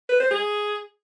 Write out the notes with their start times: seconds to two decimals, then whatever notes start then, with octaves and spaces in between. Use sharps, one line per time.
0.09 B4
0.20 C5
0.31 G#4